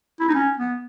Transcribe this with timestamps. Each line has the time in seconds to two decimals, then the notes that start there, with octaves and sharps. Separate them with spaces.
0.20 E4
0.28 D#4
0.35 C#4
0.58 B3